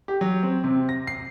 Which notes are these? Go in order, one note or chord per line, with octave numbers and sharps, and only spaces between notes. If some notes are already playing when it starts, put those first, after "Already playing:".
G4
F#3
C4
C3
A#6
C7